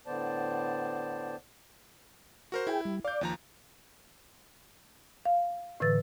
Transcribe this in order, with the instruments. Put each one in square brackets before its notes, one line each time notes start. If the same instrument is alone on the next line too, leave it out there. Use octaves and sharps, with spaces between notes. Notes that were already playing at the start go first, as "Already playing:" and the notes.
[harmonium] A2 D3 B3 C5 D5 A5
[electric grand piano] F#4 A#4 C5
[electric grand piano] E4 [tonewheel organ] G#4 G5
[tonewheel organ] G3
[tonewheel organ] D5 [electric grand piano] F5 G6
[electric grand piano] D#2 F3 A#5
[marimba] F5
A2 D3 E3 B4 E6 A6